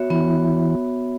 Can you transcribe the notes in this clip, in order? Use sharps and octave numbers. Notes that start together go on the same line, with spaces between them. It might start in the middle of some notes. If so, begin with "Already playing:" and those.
Already playing: B3 F#4 C#5 E5
E3 B3